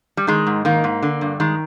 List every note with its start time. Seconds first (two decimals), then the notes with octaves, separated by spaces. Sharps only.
0.17 G3
0.27 D#3 G#3
0.47 G#2
0.65 D#3 A#3
0.84 G#2
1.03 D3
1.21 G2
1.40 D#3 G#3